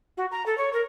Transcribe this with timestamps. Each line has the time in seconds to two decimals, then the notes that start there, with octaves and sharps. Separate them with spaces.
0.17 F#4
0.31 A#5
0.46 A4
0.57 C#5
0.73 A#4